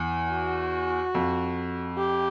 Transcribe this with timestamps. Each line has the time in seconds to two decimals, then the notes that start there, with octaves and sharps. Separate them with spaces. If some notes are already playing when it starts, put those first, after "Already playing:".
Already playing: E2
0.32 F#4
1.15 F2
1.98 G4